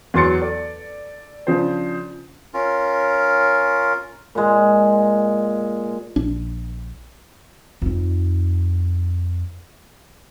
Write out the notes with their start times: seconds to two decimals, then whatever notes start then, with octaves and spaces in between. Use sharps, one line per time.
0.14 E2 F#3 C6 A6 C#7
0.41 A4 D5
1.47 C#3 F3 D4 C5
2.54 C#4 F4 A#4
4.35 A#2 G#3
6.16 A#1 D4
7.82 F2 D#4